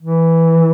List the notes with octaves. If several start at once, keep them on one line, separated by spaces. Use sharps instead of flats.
E3